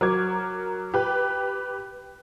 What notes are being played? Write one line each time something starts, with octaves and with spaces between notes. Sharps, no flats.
F#3 A#4 D6 G#6
G4 B4